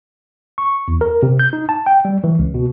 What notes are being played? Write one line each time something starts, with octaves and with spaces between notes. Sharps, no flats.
C#6
E2
A#4
C3
G6
D#4
A5
G5
G3
E3
C#2
B2